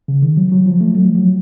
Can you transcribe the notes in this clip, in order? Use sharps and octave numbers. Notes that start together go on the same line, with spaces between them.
C#3
D#3
F#3
F#3
F3
A3
F#3
F3
F#3